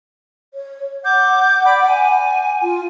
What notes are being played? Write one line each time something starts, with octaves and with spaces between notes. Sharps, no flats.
C#5
F#5 D6 G6
D5 B5 D6
G#5
F4